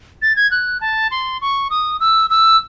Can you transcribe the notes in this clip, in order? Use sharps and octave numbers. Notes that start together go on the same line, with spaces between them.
A6
G#6
F#6
A5
C6
C#6
D#6
E6
E6